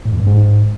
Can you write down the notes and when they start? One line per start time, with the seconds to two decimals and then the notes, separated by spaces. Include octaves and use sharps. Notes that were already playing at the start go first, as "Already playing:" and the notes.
0.05 A2
0.13 E2
0.20 G2
0.27 G#2